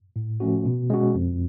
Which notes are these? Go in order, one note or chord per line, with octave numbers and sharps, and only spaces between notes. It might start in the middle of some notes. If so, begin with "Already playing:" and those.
A2
F3 A3 C#4 F#4
B2
G#3 C#4 F#4
F2